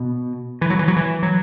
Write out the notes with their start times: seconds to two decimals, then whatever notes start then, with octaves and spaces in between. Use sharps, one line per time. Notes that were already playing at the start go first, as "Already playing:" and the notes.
Already playing: B2
0.61 E3
0.70 F#3
0.79 E3
0.88 F#3
0.96 E3
1.23 F#3